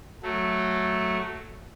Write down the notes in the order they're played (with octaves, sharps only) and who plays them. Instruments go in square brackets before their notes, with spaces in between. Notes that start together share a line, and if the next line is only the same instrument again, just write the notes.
[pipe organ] F#3 A3